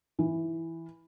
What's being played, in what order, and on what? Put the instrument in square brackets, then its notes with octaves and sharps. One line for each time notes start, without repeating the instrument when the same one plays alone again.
[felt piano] E3